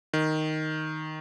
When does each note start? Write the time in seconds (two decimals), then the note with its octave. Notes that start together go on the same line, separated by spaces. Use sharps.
0.13 D#3